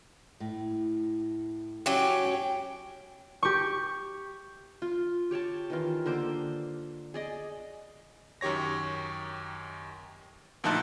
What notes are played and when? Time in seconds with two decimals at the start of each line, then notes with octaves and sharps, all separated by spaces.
0.40 A2
1.86 F#3 C#4 G4
2.26 G5
3.43 G4 C#6
4.82 F4
5.31 G4 C#5 G5 A5
5.70 D#3 E3 F4
6.06 D3 A#3 C5 D6
7.14 G#4 D5 D#5
8.41 F#2 D#3 G4 C#5 A#6
10.64 D2 A#2 F3 D#4 A5 F#6